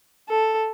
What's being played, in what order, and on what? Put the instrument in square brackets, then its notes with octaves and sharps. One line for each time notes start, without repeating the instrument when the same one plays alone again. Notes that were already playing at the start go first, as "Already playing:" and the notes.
[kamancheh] A4